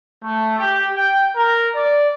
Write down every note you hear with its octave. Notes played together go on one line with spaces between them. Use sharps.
A3
G4
G5
A#4
D5